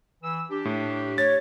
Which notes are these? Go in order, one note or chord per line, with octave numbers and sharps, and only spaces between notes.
E3 E6
D4 G4
A2
C#5 A6